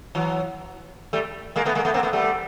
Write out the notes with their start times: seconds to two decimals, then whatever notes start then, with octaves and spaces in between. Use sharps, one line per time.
0.15 E3 F#3
1.13 G3 A3
1.56 G#3 A#3
1.65 A3 B3
1.75 G#3 A#3
1.85 A3 B3
1.94 A#3 C4
2.03 A3 B3
2.13 G3 A3